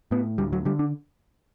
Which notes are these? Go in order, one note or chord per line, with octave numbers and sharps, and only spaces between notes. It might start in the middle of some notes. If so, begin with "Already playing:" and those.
A2 B3
D2 G3
F#3
D3 G3
D4